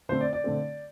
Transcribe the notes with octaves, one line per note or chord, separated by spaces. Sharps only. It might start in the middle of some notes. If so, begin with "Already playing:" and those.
D3 A3 C4 C5
D5
D5
D3 A3 C4